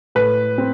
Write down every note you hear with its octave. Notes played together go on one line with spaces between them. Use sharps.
A2 B4
C4